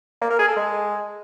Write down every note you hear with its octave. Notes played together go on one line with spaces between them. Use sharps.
A#3
A#4
G#4
A4
G#3